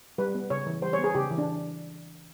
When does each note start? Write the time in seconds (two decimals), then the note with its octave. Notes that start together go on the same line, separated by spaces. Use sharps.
0.18 G3 B4
0.35 B3
0.50 C#3 C#5
0.66 E3
0.82 G3 C5
0.93 C#5
0.99 B3
1.04 G#4
1.15 C#3 G4
1.31 E3
1.38 D4